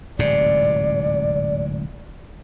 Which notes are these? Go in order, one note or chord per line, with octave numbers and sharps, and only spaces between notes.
D1 G#2 C3 D5